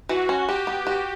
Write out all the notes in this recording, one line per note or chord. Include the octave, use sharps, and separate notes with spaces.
E3 F#4
C#4
F#4 G4
B3
F#4